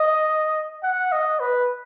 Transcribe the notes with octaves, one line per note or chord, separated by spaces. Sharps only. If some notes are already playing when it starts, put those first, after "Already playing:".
Already playing: D#5
F#5
D#5
B4